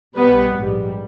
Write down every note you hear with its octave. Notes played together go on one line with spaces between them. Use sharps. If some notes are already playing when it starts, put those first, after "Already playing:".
B1 B2 G3 B3 B4
A#1 G#2 G3